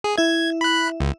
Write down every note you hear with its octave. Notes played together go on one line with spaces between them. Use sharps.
G#4
E4 E5 G#6
B5 F#6
C#2